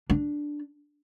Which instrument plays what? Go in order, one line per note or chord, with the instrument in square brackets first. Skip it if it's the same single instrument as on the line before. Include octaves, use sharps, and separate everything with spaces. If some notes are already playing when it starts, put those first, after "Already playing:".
[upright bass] D4